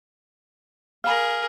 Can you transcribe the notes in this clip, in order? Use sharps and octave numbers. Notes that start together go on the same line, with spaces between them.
G#4 A#4 F5 B5 F6